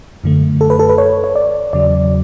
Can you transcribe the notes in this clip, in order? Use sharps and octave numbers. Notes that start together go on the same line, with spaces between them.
F#2 D3 A3
A4
B4
A4
B4
C#5
C#5
D5
E2 C#3 F#3 D5